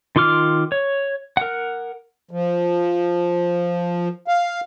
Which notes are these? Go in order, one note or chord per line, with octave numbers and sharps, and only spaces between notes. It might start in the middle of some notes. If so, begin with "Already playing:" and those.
D#3 F4 C6 D6 F6
C#5
A#4 F#5
F3
F5